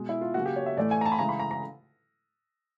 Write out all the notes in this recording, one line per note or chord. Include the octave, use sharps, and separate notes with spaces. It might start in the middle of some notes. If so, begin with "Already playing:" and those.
Already playing: B2 G#3
E4
F4
C#3 F#3 A#3 F#4
G4
C#5
E5
A2 E3 A3 D5
G#5
A#5
A5
B5
C#3 E3 G#3 A#5
B5
A#5
A#5